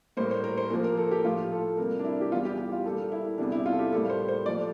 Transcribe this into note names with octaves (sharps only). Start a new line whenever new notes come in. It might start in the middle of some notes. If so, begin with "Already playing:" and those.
A2 G3 A#3 C5
C5
A#4
C5
A#2 F3 A#3 A#4
A#4
A4
G4
A2 F3 A3 F4
A4
C3 G3 A#3 A#4
D4
E4
G4
E2 E3 G3 F4
G4
G4
F4
A#2 G3 A#3 A4
E4
E2 C3 G3 D4
E4
F4
A4
G4
A2 G3 A#3 A4
C5
C5
A#2 F3 A3 D5